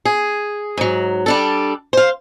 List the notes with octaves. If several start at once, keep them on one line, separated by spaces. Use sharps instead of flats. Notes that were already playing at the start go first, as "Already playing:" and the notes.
G#4
G#2 F#3
G3 D4 A4
C5 F5